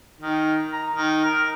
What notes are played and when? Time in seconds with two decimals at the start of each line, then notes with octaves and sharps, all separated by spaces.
0.21 D#3
0.73 A#5
0.94 D#3
1.25 A#4